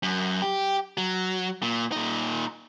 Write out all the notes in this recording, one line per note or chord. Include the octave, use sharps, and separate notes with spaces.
F#2
G4
F#3
A#2
A#2 D#4